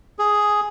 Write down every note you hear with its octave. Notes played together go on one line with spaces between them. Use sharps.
G#4